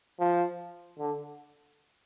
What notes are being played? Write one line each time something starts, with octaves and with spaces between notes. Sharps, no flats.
F3
D3